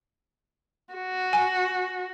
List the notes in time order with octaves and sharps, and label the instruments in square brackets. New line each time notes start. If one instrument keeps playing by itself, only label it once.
[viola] F#4
[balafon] G#5